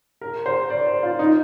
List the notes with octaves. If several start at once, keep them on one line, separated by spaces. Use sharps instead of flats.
A#4
C5
D5
C5
F4
D#4